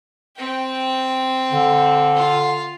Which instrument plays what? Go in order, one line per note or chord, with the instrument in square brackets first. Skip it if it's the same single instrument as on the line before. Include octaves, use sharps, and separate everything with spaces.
[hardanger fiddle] C4 G5
[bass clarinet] D3
[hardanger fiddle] F4